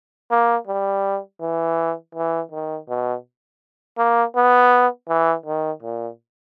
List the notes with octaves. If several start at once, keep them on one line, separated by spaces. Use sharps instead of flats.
A#3
G3
E3
E3
D#3
B2
A#3
B3
E3
D#3
A#2